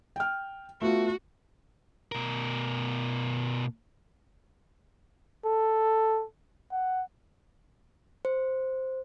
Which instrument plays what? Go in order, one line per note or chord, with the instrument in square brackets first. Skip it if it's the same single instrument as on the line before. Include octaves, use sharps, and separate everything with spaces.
[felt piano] G5 F6
[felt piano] A3 B3 F4 [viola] F#4
[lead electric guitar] B2 A#4
[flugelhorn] A4
F#5
[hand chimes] C5